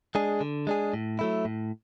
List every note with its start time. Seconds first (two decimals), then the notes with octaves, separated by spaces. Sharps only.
0.15 G#3 D4 G#4
0.41 D3
0.67 G#3 D4 G#4
0.94 A2
1.19 F#3 A3 E4
1.45 A2